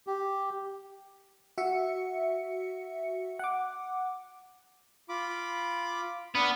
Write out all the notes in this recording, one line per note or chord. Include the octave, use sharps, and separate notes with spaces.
G4
F#4 E5 C#7
F#5 D6
F4 B5 D6
B3 D4 D#6 F6